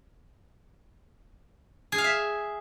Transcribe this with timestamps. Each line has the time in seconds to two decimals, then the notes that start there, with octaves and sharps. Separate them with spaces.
1.92 G#4
1.98 F5
2.04 E5